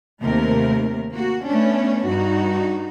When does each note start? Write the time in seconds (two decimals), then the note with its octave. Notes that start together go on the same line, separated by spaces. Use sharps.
0.21 D#2 C3 A3 A#4
1.11 A#3 F#4
1.45 A3 B3 C#4 D4
2.07 G2 D#4 F#4